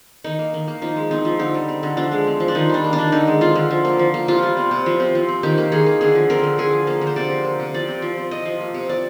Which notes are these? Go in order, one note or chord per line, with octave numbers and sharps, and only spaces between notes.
D#3 D#4
A#3
D#3
A#3
F3 D#4
G#3
C4 D#4
F3
D3 D#4
G3
C4
D3
F3 D4
G#3
C4
F3
D4
D#3 D#4
G3 D4
A#3
D4
D#3
D3 D#4
G#3
C4 F4
D3
F3
A#3
F3
A#3
C3 F4
G3
C4
C3
F3
C4
F3
C4
D#3 G4
A#3
D#3 G#4
A#3
D3 G#4
F3
C4 A#4
D3
D3 G#4
F3
A#3
D3
C5
C3 D5
F3
A#3
C3
F3 D5
C4
F3
C4
C3 D#5
F3
A#3
C3
C3 D5